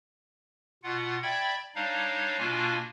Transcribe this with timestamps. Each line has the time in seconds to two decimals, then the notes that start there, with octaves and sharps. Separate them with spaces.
0.83 B2 F4 F#5
1.23 D5 E5 G5 B5 G#6
1.75 G3 D4 D#4 C#5 F5
2.38 B2 A#3 D4 F4 G#5